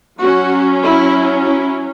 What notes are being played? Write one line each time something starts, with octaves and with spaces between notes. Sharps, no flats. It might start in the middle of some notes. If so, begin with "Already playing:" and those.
F#3 C#4 F#4
E4
E4